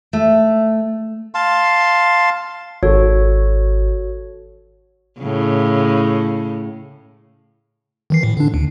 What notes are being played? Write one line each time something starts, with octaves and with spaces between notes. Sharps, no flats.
A3
F5 A5 C6
G#1 F#4 A4 C#5
A2 C#3
D#3 E3 C7
A2
D3 D4
D2